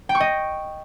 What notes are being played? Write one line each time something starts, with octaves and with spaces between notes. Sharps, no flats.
G5
C#6
D#5